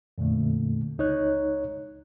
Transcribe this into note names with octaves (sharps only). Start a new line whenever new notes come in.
F2 A#2 D3 A3
C#2 D#4 C#5 F#6